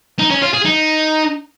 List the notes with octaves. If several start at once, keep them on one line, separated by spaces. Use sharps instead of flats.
D#4
C#4
F4
G#4
D#4